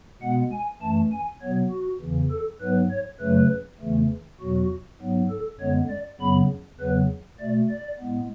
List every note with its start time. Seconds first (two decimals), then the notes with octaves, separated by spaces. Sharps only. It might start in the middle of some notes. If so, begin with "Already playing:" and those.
0.22 B2 G#3 B3 F#5
0.52 G#5
0.82 F#2 E3 A3 A5
1.12 G#5
1.42 B2 F#3 B3 C#5
1.71 F#4
2.01 E2 C#3 E3
2.31 A4
2.61 G#2 F#3 B3 B4
2.91 C#5
3.21 F#2 C#3 F#3 A3 B4
3.81 E2 C#3 E3 A3
4.41 E2 B2 F#3 F#4
5.01 G#2 F#3 B3
5.31 A4
5.60 F#2 D3 G#3 B3 C#5
5.90 D5
6.20 F#2 C#3 F#3 B3 B5
6.80 E2 C#3 F#3 B3 B4
7.40 B2 A3 D5
7.70 D5
8.00 A2 G#3 B3